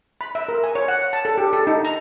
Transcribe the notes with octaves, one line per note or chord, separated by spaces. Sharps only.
B5
E5
A#4
G#5
C#5
F#5
A5
A4
G4
A4
D#4
A#5